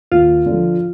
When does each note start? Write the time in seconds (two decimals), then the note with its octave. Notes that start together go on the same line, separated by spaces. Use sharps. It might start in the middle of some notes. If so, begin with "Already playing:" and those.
0.11 D#2 F4
0.46 D3
0.51 F3